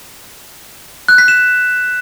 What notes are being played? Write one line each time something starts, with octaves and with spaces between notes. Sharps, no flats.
F#6
B6
E7